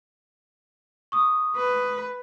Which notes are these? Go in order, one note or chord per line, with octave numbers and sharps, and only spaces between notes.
C#6 D#6
B4